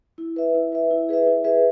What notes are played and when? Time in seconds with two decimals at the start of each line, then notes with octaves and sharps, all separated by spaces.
0.18 E4
0.36 B4 E5
0.55 E4
0.72 B4 E5
0.91 E4
1.09 G#4 B4 E5
1.26 E4
1.44 G#4 B4 E5